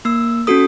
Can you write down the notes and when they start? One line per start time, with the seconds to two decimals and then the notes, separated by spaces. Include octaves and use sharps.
0.05 A#3 E6
0.47 C#4 F#4 A4 D#6